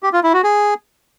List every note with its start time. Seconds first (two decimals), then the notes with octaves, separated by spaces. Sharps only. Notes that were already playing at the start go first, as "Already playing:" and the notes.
0.03 G4
0.13 F4
0.23 E4
0.34 F#4
0.44 G#4